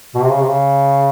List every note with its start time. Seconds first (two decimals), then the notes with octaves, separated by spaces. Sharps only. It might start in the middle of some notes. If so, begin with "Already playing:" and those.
0.15 B2
0.22 C3
0.29 C#3
0.40 C3
0.47 C#3